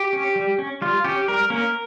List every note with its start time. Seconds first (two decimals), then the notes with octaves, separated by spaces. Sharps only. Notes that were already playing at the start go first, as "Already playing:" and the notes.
Already playing: G4
0.13 C#4
0.36 G3
0.59 C#4
0.82 G3 F4
1.04 C#4 G4
1.28 G3 A#4
1.50 A#3 C#4 A#4